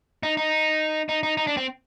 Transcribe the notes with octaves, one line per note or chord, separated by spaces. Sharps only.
D#4
D#4
D#4
D#4
D#4
D4
C4